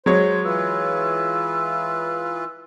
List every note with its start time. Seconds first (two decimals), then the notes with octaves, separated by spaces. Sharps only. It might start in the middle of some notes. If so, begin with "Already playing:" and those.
0.06 F#3 G#3 C5 C#5
0.45 E3 F4 B4 E6